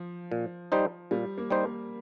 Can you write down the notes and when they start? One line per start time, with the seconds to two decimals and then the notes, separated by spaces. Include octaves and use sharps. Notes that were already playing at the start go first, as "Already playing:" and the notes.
Already playing: F3
0.32 A#2
0.72 G3 D#4 C5
1.11 A#2 G3
1.38 A#3
1.50 G3 D#4 C5
1.63 A#3